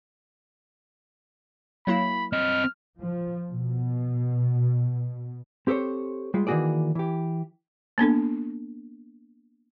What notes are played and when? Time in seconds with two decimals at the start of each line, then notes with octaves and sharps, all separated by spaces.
1.87 F#3 A#3 E4 B5
2.33 C4 D#5 F6
3.00 F3
3.51 B2
5.67 C4 G4 A4 C5 C#5
6.34 G3 G#3 F4
6.47 D#3 E3 A#3 F#4 G#4 D5
6.95 E3 G4
7.98 A#3 B3 D4 A4